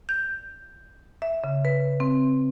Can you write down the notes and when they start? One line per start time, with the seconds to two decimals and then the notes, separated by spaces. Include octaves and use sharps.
0.09 G6
1.22 E5
1.44 C#3
1.65 B4
2.00 C4